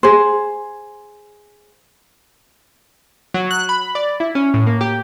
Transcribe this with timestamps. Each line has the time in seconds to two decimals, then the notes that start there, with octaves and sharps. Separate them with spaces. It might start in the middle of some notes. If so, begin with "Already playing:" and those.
0.03 G#4 C5
3.34 F#3
3.51 F#6
3.69 B5
3.95 D5
4.20 E4
4.35 C#4
4.54 A2
4.67 A#3
4.81 G4